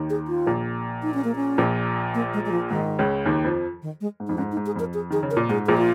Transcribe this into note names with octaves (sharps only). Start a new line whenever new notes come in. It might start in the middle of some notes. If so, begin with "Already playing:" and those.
Already playing: D#2 D#3
G#4
F4
A#1 A#2
D#4
C#4
A#3
C#4
A#1 A#2
A#3
G#3
G#3
F3
G#2 D#3
C#2 C#3
D#2 D#3
F2 F3
D#3
G#3
G#2
F2 D#4
G#2 C#4
D#4
G#2
G#4
F2 A#4
G#4
D#3 G#4
C#3
A#4
A#2
G#2 G#4
A#1 A#2 G#4
F4